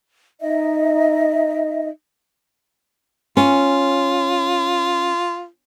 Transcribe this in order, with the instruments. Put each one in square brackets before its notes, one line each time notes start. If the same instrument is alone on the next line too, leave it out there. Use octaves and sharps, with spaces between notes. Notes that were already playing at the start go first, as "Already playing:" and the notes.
[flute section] D#4 D#5 E5
[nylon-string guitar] C#4 [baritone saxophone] F4